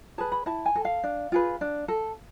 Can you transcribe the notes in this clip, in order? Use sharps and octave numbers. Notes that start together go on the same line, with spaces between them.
G#4 B4 A5
B5
E4 A5
G#5
A4
F5
D4
F4 G#4 B4
D4
A4